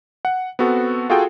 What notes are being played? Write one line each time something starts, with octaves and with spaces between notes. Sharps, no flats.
F#5
B3 C4 F#4 A4
F4 F#4 G#4 A4 G5